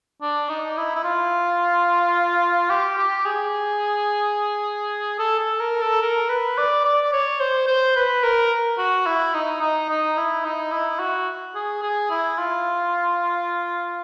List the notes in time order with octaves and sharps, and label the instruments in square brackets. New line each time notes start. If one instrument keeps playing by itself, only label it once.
[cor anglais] D4
D#4
E4
E4
F4
G4
G4
G#4
A4
A4
A#4
A4
A#4
B4
D5
D5
C#5
C5
C5
B4
A#4
F#4
E4
D#4
D#4
D#4
E4
D#4
E4
F#4
G#4
G#4
E4
F4